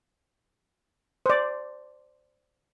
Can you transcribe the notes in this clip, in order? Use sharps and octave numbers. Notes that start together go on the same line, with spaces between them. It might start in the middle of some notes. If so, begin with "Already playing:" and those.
C5 D5